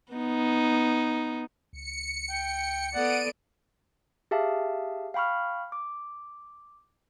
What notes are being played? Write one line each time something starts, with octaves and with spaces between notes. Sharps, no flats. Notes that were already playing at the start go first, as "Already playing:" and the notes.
B3 D#4
C#2 C#7
G5
B3 A4 D5 F#5 D7 D#7
G4 G#4 E5 F5 A5
F5 G5 B5 C#6 F6
D6